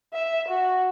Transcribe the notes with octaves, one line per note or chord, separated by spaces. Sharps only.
E5
F#4